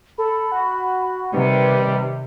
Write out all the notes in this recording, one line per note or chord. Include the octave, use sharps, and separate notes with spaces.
A4 B5
F#4
C3 D#3 G3 B4